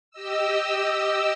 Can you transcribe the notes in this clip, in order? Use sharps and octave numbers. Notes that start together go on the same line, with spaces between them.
G4 D#5 E6